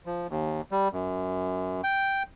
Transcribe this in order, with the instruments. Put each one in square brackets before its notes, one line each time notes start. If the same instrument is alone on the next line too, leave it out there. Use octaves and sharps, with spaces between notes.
[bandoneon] F3
D#2
G3
F#2
G5